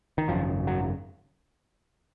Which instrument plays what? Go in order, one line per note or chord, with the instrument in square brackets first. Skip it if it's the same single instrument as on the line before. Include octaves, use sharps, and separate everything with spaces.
[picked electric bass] D#3
G#1 F#2 C#3 F3
F#3